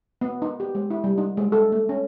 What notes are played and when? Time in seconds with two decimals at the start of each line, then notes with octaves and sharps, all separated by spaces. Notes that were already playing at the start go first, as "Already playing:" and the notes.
0.21 B3
0.42 D#4
0.60 G4
0.75 G#3
0.90 E4
1.04 G3
1.18 D#4
1.37 G#3
1.52 A4
1.72 A3
1.89 C#4